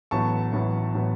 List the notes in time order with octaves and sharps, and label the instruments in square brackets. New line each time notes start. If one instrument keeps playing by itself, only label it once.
[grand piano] A1 A2 F#3 B3 A5 C#6
A1 A2 F#3 B3
A2 F#3 B3